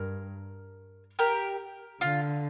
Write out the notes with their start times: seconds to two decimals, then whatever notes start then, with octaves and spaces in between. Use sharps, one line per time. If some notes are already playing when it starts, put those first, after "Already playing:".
Already playing: G2 A#4
1.19 G4 A#4
2.01 D3 F4